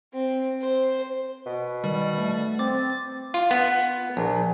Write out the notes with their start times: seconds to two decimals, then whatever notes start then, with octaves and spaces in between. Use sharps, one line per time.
0.13 C4
0.61 C5
1.46 B2
1.84 D#3 G3
2.18 A3
2.59 C4 D6 A6
3.34 F4
3.51 B3
4.17 A#1